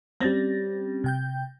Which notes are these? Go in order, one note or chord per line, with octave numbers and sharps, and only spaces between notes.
G3 C4 C#4 A6 A#6
C3 G5 G6